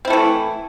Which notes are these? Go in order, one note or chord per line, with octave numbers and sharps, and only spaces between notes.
E3 A3 C4 E4